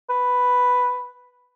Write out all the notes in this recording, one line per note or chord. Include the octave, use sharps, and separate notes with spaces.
B4